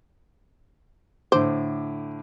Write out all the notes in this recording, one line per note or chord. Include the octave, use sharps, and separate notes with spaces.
A2 D3 C5 D6